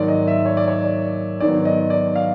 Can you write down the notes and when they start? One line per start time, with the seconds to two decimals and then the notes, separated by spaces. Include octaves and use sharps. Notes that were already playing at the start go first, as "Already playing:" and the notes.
Already playing: G#2 D#3 F#3 A#3 D5
0.08 D#5
0.28 E5
0.45 C#5
0.57 D5
0.68 C#5
1.40 G#2 D#3 F#3 B3 D5
1.65 D#5
1.90 D5
2.16 F5